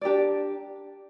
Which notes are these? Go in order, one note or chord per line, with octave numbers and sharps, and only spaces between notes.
D4 G4 A#4 D5